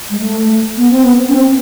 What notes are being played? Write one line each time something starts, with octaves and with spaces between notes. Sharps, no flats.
G#3
A3
B3
C4
B3
C#4
C4